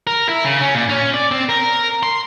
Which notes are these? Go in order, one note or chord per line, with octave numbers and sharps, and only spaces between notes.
A#4
E4
C#3
C#4
A#2
C#4
D5
C4
A#4
C6